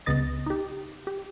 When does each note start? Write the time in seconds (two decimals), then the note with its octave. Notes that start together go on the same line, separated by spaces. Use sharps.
0.06 C#2 C#3 B3 D#5 A6
0.46 D#4 G4
1.07 G4